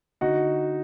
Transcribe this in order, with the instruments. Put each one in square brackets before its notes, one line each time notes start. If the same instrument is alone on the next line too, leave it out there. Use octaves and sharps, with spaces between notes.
[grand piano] D3 D#4 F#4